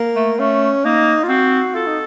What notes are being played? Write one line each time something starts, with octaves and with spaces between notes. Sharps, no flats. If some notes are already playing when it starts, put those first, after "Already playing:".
Already playing: A#3
A3
A3 C#4
A#3 D#4
F4
C4 F#4
F4 A4
D#4